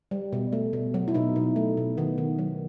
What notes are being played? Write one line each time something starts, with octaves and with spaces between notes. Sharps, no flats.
G3
B2
A3
B2
F#3
E4
B2 D#4
B2
A3
B2
D#3 B3
D#3
F#3